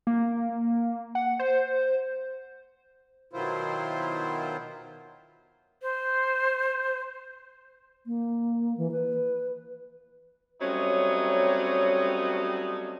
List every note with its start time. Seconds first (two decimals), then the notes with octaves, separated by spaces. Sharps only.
0.07 A#3
1.15 F#5
1.39 C5
3.33 B2 D#3 F#3 E4 F4 C5
5.82 C5
8.06 A#3
8.78 E3
8.91 B4
10.61 F#3 G3 A3 C4 C#4 D#4